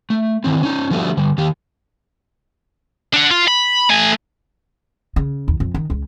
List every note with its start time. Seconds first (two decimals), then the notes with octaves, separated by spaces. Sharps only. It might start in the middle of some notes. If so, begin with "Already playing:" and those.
0.10 A3
0.44 D#3 E3 C4
0.63 C#4 D#4
0.91 D3 F3 G3 A3 B3 F#4
1.17 D3 G3
1.38 D#3 G4
3.14 D4 F#5
3.31 F4
3.48 B5
3.90 A3 G#5
5.16 C#3
5.48 D#2
5.60 F2
5.74 D#3
5.90 C#2